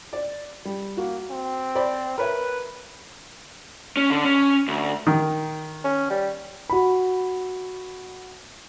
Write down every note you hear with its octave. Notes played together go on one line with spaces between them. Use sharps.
D5
G3
A#3 F#4
C4
C5 D5 B5
A#4 B4 C#5 E5
C#4
D3
C#4
D2
D#3
C#4
G3
F#4 B5